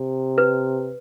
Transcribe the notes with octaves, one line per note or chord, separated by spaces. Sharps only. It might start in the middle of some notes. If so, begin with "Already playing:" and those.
Already playing: C3
B4